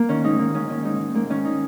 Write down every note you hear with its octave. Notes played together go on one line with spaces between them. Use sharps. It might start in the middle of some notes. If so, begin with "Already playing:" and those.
Already playing: A#3
D#3 C#4
G#2 D#4
D#3 A#3
G#2 C#4
D#3 C#4
G#2 D#4
D#3
G#2 A#3
D#3 C#4
D#4